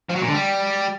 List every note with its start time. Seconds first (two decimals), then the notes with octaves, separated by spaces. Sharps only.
0.09 F3
0.16 F#3
0.22 A#2
0.28 D3
0.34 G3